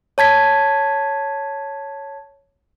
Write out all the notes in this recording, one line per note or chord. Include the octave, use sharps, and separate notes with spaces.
C#5 A5 G#6 B6